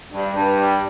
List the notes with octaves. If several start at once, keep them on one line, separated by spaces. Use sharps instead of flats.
G2
G2
G3